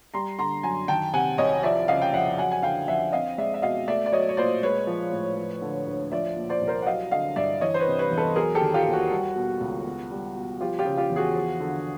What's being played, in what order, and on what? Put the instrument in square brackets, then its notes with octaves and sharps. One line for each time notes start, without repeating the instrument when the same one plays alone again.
[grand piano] G3 A#5 C6
D3 A#5 C6
F#2 G#5 A#5
D#3 G5 A5
C3 F#5 G#5
C2 C#5 D#5
F3 D5 E5
C#3 D#5 F5
G5
F2 E5 F#5
F#3 F#5 G#5
G#5
D3 F5 G5
F2 E5 F#5
C4 D#5 F5
G#3 D5 E5
E5
B2 D#5 F5
A3 D5 E5
D5
F#3 C#5 D#5
C#5
A#2 C5 D5
G#3 B4 C#5
F3
A2
F3
D3
D2
F3 D5 E5
A#2
C5 D5
C2
A#4 C5
F#5
F#3 D#5 F5
D3 D#5 F5
G2 D5 E5
E3 C#5 D#5
C5
B4 C#5
C3
B4 C#5
E2
A4 B4
F#3 G#4 A#4
G4 A4
D#3
F4 G4
D#2
F#4
G3
B2
C#2
B3
G3
B2
F3 F4 G4
F4 G4
C#3
F4 G4
E2
F#4 G#4
F3
D3